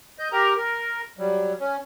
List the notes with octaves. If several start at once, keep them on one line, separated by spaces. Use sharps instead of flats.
D#5 G6
G4 A#4 A#5
A#4
F#3 G3
C#4